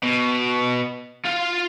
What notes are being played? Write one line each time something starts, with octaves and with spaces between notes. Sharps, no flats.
B2
F4 F5